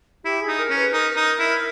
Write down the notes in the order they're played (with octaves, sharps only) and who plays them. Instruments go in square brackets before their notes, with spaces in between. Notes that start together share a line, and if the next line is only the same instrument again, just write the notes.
[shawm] E4 [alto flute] G4
[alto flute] G#4
[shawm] D#4
[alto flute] A#4
[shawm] C#4
[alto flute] B4
[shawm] D#4 [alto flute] A#4
[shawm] D#4
E4